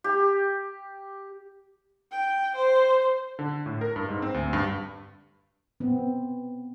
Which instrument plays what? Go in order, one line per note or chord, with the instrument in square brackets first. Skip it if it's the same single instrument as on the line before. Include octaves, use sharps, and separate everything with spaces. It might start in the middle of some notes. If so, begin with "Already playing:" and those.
[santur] G4
[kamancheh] G5
C5
[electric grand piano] D3
A2
A#4
G2
G#2
C4
D2
G2
[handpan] B3 C4